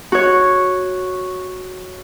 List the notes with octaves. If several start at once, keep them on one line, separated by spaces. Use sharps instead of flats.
F#4 C#5